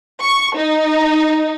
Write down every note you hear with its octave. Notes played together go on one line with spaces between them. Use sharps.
C#6
D#4